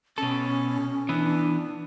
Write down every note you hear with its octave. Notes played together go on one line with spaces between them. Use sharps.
B2 C#4 A4
E3 B3 D4